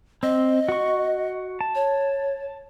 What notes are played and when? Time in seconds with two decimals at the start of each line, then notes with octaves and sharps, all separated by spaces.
0.23 C4 D#5
0.69 F#4 C#6
1.61 A5
1.75 C#5